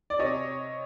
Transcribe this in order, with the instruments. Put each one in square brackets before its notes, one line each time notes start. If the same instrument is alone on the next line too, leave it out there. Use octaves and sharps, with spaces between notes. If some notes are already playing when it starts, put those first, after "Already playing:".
[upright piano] D5
C3 C#5 D#5